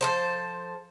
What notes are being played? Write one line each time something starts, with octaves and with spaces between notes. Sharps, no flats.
F3 A4 C5